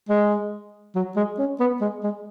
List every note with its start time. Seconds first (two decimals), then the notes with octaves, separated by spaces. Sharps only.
0.09 G#3
0.95 F#3
1.16 G#3
1.38 C#4
1.60 B3
1.81 G#3
2.03 G#3